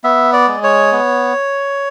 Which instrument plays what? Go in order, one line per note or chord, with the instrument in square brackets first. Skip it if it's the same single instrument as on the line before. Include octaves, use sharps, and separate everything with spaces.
[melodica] B3 E5
D5
G#3
C#5
B3